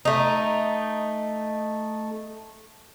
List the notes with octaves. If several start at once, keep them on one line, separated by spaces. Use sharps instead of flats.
A3 D#4